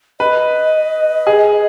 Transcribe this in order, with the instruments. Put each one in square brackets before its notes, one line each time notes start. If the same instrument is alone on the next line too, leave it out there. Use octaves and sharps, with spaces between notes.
[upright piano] B4 [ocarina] D#5
[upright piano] G#4